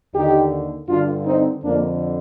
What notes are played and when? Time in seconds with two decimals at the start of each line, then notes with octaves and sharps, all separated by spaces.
0.14 D#2 D3 D#4 G4
0.88 G2 D3 D4 F4
1.26 C4 D#4
1.63 F2 D3 A#3 D4